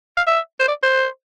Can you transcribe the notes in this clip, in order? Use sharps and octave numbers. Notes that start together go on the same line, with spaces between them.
F5
E5
C5
D5
C5